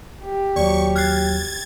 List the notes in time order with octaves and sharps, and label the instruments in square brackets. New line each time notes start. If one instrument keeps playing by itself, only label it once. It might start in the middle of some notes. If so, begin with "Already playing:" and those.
[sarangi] G4
[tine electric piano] D#2 F#3 [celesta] D5 [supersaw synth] C#6
[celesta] F6 F#6 C7 [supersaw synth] G#6 A6